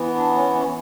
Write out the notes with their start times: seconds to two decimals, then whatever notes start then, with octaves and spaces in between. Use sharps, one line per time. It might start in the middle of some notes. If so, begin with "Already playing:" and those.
Already playing: E3 B3
0.14 D4
0.34 C#4
0.55 C#4